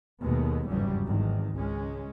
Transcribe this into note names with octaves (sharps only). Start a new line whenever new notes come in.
D#2 B2 D#3 G#3 A3 B3
G1 E2 G#2 C#3 F#3 G3
G#1 E2 D#3
C#2 G#3 C#4